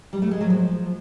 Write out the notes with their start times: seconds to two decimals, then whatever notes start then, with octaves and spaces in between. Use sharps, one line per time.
0.13 G3
0.22 A3
0.31 G#3
0.41 F#3
0.50 F3